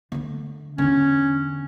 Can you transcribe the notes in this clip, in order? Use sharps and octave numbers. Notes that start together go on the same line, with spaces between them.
D3 A3
E2 D3 C#4